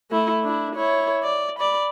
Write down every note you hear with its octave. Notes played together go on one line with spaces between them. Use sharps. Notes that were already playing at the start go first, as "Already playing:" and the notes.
A3 E4
D4 E4
E4 C#5
D5
D5 B5